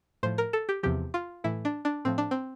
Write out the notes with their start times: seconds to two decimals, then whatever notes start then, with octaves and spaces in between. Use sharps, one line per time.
0.23 A2 F3 C5
0.38 A#4
0.53 A4
0.69 G4
0.83 E2 C3 F3 G4
1.14 F4
1.44 A2 E3 E4
1.65 D4
1.85 D4
2.05 A2 F3 C4
2.18 D4
2.31 C4